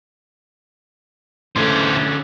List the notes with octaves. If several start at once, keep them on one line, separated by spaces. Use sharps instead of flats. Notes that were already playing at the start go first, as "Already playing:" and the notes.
D3 E3 A3 C#4 C5